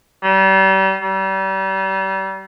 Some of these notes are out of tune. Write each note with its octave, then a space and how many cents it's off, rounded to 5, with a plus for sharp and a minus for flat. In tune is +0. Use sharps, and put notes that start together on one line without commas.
G3 -35
G3 -35